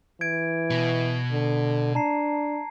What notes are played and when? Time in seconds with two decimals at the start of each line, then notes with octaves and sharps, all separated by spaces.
0.21 E3 G#6 D7
0.70 B2
1.32 D3
1.95 D4 A5 A#5 C7